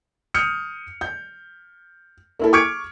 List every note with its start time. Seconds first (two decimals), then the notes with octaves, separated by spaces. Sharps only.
0.34 D#6 F6 G6 C#7
1.01 G6
2.39 A#3 E4 A4
2.53 C#6 D6 F6 G#6 C#7 D7